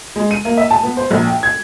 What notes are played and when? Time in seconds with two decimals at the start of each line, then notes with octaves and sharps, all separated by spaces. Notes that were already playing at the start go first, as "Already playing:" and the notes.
0.16 G#3
0.31 D#7
0.45 A#3
0.57 E5
0.71 A5
0.83 B3
0.97 C5
1.11 A#1
1.27 G5
1.43 G#6